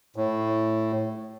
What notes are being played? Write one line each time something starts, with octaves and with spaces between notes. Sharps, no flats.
A2